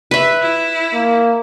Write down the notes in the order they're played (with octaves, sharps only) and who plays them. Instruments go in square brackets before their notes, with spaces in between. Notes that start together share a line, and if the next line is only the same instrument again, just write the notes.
[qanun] B4 E5
[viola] E4
[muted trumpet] A#3